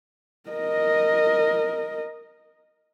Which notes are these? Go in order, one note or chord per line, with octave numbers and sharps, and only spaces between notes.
A#4 D#5